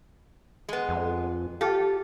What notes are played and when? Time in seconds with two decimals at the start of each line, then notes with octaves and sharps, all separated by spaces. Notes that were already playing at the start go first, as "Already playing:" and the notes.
0.69 G#3 B3
0.89 F2
1.61 F4 G4 A4